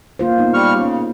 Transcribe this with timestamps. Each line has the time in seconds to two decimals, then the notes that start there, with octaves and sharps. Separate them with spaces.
0.19 A#3 F4 C5
0.38 B3 D#4
0.54 G3 C#6 F6
0.77 C#3